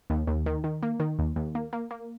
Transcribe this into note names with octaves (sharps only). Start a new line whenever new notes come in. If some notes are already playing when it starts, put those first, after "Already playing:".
D#2
D#2
D#3
D#3
A#3
D#3
D#2
D#2
A#3
A#3
A#3